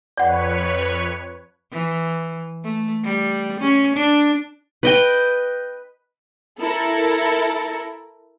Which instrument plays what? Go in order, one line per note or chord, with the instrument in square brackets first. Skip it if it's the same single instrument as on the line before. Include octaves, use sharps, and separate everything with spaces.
[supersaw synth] F2 B4 C#5 [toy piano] D5 F#5
[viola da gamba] E3
A3
G3
C#4
D4
[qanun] B4 D#5 G5
[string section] E4 A4 A#4